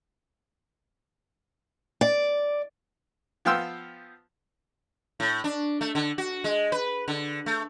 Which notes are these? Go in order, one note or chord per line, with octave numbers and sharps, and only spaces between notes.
D5
F3 B3 F5 G5 C6 E6
A2
D4
A3
D3
F#4
G#3
B4
D3
A3